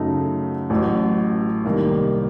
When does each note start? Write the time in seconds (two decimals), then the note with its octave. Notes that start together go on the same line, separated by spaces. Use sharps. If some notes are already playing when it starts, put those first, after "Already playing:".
Already playing: F#2 C#3 A3 D#4
0.70 A1 A2 F#3
1.65 C2 C3 D#3 A#3